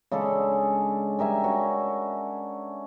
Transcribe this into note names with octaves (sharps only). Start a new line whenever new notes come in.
C#3 G#3 D4 A4
G3 A#4 E5 G#5
C#4 D4 F#4